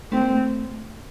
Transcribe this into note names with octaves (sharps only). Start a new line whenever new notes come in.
A3 C4
A#3
A3